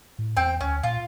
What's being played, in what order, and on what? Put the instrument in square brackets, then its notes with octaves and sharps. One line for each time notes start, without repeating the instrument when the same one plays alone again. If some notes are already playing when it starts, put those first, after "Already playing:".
[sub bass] A2
[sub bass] E2 [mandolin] C4 G5
[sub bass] D2 [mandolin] C#4
[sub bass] A#2 [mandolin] F4